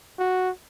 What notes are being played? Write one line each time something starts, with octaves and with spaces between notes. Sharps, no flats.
F#4